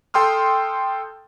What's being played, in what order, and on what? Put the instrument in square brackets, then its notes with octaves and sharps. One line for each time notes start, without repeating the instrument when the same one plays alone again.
[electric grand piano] A4 G5 C6 D#6 F6